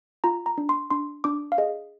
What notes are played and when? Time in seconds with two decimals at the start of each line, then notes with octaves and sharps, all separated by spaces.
0.24 F4 A#5
0.46 A#5
0.58 D4
0.69 C6
0.90 D4 C6
1.24 D4 D6
1.52 F5
1.58 G#4 D#5